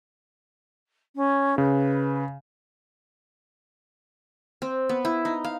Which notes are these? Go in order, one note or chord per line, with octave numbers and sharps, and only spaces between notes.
C#4
C#3 B4
C4
B3
E4
D#4
F5